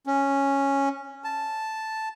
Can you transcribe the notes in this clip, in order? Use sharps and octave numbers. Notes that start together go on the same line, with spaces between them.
C#4
A5